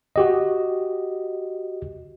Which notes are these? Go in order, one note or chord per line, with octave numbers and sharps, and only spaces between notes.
F#4 G4 D#5